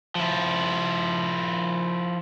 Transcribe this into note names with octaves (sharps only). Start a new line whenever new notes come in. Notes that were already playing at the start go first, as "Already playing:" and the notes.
F3 E4